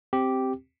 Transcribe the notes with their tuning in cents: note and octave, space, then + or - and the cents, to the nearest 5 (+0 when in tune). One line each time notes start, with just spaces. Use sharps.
C4 +0 G4 -5